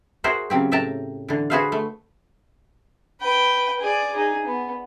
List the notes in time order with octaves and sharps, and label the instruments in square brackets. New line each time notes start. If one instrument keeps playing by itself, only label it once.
[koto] F#4 G#4 A#4 C5 E5 F#5
C#3 F#3 C4 G4
A2 E5 G5 A5 A#5
D3 E3
F#4 G#4 B4 C5 E5 F5
A3
[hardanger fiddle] B4 G5
G#4 D5
D#4 G#4
B3